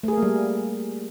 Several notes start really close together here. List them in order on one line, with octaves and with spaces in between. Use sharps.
A3 G#4 A#4 A#3 G3